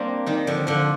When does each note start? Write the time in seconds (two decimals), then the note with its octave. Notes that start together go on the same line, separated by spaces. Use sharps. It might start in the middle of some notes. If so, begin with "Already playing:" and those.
Already playing: G3 A#3 C4 D4
0.26 D#3 G3
0.47 D3 F3
0.67 D3 F3